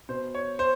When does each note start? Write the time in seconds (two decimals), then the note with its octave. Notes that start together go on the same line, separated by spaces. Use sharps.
0.09 B2 C5
0.35 C#5
0.59 C5